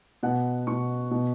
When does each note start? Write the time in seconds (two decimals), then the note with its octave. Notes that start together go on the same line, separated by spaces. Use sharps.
0.23 B2 F#5
0.67 B2 C#6
1.11 B2